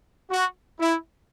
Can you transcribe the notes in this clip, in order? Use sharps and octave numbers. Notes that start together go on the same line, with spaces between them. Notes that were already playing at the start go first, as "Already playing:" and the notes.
F#4
E4